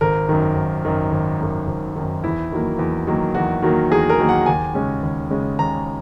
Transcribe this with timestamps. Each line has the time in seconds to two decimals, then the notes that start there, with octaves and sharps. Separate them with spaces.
0.01 G#1 A#4
0.29 F#2 D#3
0.56 G#1
0.85 F#2 D#3
1.11 G#1
1.39 F#2 D#3
1.67 G#1
1.96 F#2 D#3
2.24 E2 E4
2.52 D#3 F#3 A#3
2.79 E2
3.07 D#3 F#3 A#3
3.35 E2 F#4
3.62 D#3 F#3 A#3
3.90 E2 G#4
4.10 A#4
4.19 D#3 F#3 A#3
4.29 F#5
4.46 D#2 G#5
4.74 C#3 G#3 C#4
5.03 D#2
5.30 C#3 G#3 C#4
5.59 D#2 A#5